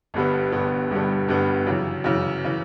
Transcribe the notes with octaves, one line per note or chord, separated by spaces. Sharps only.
G1 G2 D3 G3 B3
G1 G2 D3 G3 B3
G1 G2 D3 G3 B3
G1 G2 D3 G3 B3
F#2 C#3 E3
F#2 C#3 E3
C#3 E3